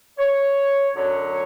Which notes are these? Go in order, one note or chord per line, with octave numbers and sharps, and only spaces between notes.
C#5
F#2 D3 F#3 C#5